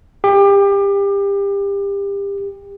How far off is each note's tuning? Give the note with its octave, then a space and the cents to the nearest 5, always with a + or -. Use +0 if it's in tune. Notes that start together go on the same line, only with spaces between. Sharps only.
G4 +30